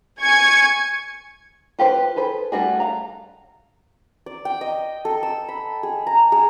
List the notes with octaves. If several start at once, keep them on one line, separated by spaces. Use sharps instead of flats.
G#5 C#6 G#6
F4 G4 B4 C5
G#4 A4 B4 C5
G3 A3 E4 F#4 G#4
F5 A#5
D5
G5
D#5
A4
E6
B5
G#4
A#5
G#4